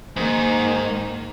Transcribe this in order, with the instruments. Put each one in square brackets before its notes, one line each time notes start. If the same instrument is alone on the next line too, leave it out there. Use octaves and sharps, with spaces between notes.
[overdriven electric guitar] G#2 [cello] D#3 A#3